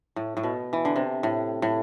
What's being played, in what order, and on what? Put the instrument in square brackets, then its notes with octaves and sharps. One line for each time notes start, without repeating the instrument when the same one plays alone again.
[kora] A2
A2
B2
E3
D3
C3
A2
A2